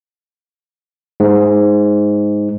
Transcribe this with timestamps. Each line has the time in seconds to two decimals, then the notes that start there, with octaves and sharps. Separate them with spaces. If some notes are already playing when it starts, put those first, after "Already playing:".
1.20 G#2